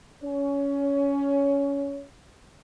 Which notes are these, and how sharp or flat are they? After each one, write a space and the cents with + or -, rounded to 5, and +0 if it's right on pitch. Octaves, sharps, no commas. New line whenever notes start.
C#4 +15 C#5 +20